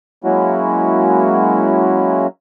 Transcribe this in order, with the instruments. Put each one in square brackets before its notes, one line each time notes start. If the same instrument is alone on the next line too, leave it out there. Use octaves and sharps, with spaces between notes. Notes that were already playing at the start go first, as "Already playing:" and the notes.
[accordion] F#3 G#3 A#3 C#4 E4 F#4